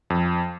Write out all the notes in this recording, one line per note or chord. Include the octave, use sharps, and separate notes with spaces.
F2